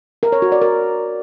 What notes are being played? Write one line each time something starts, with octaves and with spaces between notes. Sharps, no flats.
A#4
C#5
F#4
D5
A#4